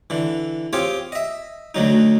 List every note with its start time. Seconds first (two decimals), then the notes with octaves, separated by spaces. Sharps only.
0.10 D3 E3
0.73 C4 F4 G4 G#4 C#5
1.12 D#5 E5
1.75 D2 D3 F#3 D#4